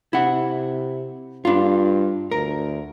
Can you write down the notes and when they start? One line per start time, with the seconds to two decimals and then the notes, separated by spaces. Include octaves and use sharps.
0.13 C3 E4 F#5
1.45 G2 D4 F4
2.31 D2 A#4